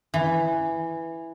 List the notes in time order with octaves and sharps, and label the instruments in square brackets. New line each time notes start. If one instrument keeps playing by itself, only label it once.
[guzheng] E3